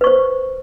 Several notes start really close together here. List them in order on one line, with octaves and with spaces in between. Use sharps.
B4 C#6 C5